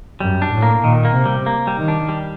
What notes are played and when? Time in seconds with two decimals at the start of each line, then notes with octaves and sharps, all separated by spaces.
0.20 F#2 G3
0.42 D4
0.52 A2
0.62 A#3
0.84 A#2 D#3
1.05 A#3
1.15 C3
1.26 G3
1.46 A#3
1.67 G3
1.77 D#3
1.88 D4
2.09 G3